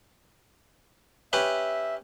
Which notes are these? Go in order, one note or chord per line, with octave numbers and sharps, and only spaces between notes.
C#4 G4 B4 E5